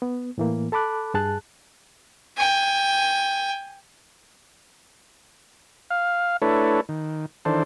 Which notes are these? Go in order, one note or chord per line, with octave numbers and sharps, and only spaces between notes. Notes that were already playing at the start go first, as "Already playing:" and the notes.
B3
A2 E3 A#3
A4 A5 B5 D6 F#6
G2 G#4 A5 F#6
G5 G#5
F5
A3 D4 E4 A4 B4 C#5
D#3
D#3 E3 D4 A4 C5